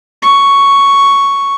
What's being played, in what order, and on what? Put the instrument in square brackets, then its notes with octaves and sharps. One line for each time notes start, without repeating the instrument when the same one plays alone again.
[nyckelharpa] C#6